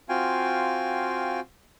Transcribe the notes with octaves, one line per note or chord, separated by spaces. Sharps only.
C4 F4 F#4 F5 G5 G#5